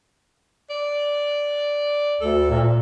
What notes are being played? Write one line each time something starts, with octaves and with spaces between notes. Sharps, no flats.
D5
D2 A4
A#2